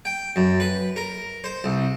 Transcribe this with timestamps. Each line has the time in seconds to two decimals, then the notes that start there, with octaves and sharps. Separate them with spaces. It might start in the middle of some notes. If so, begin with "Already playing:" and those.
0.05 G5
0.36 F#2
0.60 B4
0.96 A#4
1.44 C5
1.64 C2